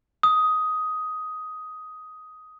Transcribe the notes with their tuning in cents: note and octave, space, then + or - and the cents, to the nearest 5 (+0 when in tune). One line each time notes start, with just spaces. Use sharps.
D#6 +10